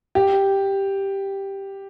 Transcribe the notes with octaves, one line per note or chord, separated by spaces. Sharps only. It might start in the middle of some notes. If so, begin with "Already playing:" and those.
G4